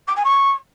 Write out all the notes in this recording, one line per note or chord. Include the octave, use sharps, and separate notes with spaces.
D6
G#5
C#6